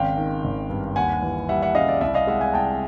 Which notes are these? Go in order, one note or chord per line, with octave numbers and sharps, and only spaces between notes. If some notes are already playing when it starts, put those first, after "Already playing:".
Already playing: G#1 C#3 F5 G5
D#3
G#1
G2
D#2 F#5 G#5
E3
G3 E5 F#5
E5 F#5
C#3 D#5 F5
D5 E5
C2 D5 E5
D#5 F5
G#3 E5 F#5
F#5 G#5
C2 G5 A5